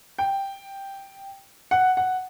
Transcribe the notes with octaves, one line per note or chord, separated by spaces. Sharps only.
G5
F#5
F#5